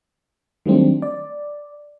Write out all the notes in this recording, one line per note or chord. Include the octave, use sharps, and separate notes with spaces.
D#3 F#3 G3 A3 C4 D4
D5